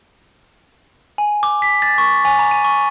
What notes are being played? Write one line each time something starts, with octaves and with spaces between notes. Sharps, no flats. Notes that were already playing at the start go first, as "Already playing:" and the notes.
G#5
D6
B6
A6
C#6
G#5
A#5
D#7
C#6